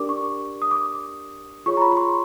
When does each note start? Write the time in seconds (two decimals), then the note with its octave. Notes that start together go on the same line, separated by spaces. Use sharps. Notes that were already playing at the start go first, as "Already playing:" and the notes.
Already playing: D4 G4 A#4 D5 D6
0.09 C#6
0.62 D#6
0.71 D6
1.66 F4 G#4 C#5 C#6
1.77 A#5
1.81 B5
1.92 C#6
1.97 C6